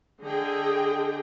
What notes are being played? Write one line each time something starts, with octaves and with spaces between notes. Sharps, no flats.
D3 G#4 D#5 G5